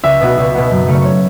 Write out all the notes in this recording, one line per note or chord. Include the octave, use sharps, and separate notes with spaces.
C#2 E5
B2 B3 F#4
C#2
B2 B3 F#4
F#2
C#3 A3 C#4
C#5